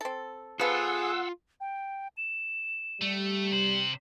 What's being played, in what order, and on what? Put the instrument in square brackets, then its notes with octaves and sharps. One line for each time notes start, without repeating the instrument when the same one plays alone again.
[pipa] C4 A4
[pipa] F3 B3 A4 [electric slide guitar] F4 [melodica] G#4 [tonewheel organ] F#5 E6
[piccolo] G5
E7
[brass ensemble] G3 [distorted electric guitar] A3
[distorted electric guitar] C3 C5 [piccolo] F#7